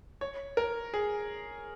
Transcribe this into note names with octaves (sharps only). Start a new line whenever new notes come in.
C#5
A#4
G#4